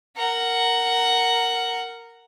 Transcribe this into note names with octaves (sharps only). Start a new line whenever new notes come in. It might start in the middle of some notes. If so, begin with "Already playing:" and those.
A#4 F#5